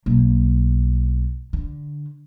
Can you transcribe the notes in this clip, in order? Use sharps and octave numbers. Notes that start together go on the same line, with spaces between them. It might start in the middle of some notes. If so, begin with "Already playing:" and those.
B1 A#3
D3